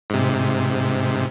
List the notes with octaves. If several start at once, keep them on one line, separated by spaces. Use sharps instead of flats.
G#2 C3